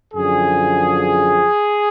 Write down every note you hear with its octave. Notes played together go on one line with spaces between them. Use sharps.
F#2 D3 F3 G#4